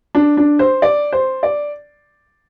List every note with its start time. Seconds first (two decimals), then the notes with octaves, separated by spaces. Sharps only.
0.15 D4
0.37 D4
0.59 C5
0.82 D5
1.12 C5
1.43 D5